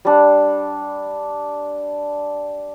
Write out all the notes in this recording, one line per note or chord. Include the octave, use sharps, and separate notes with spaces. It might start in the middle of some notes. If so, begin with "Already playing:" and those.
G3 D4